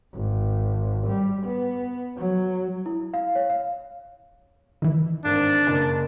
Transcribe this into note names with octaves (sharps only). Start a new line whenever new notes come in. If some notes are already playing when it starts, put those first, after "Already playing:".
G#1
G3
B3
F#3
E4
F5
C#5
F5
D#3 E3
G#1 D4
F#1